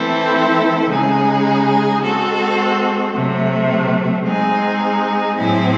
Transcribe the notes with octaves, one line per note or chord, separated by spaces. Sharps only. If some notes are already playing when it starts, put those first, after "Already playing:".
Already playing: E3 A3 C4 E4 A4
C#3 G#3 D#4 G#4
G#3 C4 F#4 A4
C3 F#3 A3
G#3 C4 D#4 G#4
A2 F#3 C4 E4 G#4